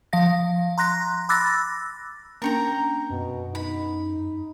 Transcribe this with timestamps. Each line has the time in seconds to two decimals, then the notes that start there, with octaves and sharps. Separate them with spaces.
0.13 F3 F5 A#6
0.78 A#5 C6 F#6 A#6
1.29 B5 D6 E6 F#6 A6 A#6
2.42 A#3 C#4 D4 A#4 G5 A#5
3.10 F#2 B2
3.55 D#4 B5